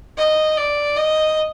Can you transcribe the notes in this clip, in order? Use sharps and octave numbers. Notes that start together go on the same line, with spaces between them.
D#5
D5
D#5